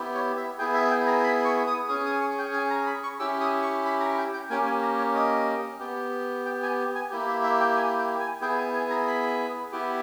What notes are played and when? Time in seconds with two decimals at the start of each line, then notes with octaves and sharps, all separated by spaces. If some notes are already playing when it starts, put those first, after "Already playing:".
Already playing: B3 E4 G4
0.14 C#5
0.37 E5
0.59 B3 E4 G#4 G5
0.74 E5
0.91 G5
1.07 A#5
1.23 B5
1.45 C#6
1.67 D#6
1.89 C#4 G#4 D#6
2.06 D#6
2.21 C#6
2.38 G5
2.53 G#5
2.70 A#5
2.87 B5
3.03 C#6
3.20 C#4 E4 G4 E6
3.41 D#6
3.62 C#6
3.85 B5
4.00 A#5
4.18 G5
4.34 G5
4.50 A#3 C#4 G4 G#5
4.66 G#5
4.83 A#5
4.98 C#5
5.15 D#5
5.80 B3 G4
6.45 G5
6.63 G#5
6.95 G#5
7.11 A#3 E4 G4
7.28 E5
7.43 E5
7.60 G5
7.76 G#5
7.99 G5
8.20 G#5
8.41 B3 E4 G#4 G5
8.58 G#5
8.74 G#5
8.90 A#5
9.07 B5
9.72 B3 E4 G4